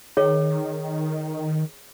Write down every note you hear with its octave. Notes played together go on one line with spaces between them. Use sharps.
D#3 G#4 C#5